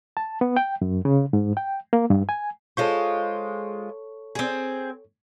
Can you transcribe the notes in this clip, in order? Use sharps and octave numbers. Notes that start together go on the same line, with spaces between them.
A5
B3
G5
F#2
C#3
G#2
G5
A#3
G2
G#5
G#3 F4 A4 C5 C#5 C#6
C4 G#4